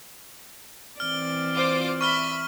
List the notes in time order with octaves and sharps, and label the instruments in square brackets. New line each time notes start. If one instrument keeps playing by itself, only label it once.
[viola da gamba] E3 C4 D5 [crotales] F6 G7
[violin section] F4 C5 D6
[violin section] E5 B5 [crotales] C#6 F6 G7